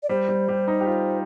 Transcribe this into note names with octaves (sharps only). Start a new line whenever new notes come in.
D5
G3 C5
G3
G3
D#4
G4
F4